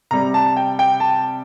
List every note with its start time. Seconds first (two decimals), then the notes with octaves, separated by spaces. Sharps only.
0.11 C3 G3 A#5
0.34 A5
0.57 G5
0.79 G5
1.00 A5